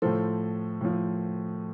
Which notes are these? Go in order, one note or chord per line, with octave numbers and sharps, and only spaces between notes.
A2 F3 A4 C5
A2 F3